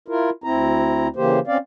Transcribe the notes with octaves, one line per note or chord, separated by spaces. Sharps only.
E4 F4 A#4
D2 C4 E4 A#5
C#3 E3 A#3 G4 C5
C4 C#4 D5 F5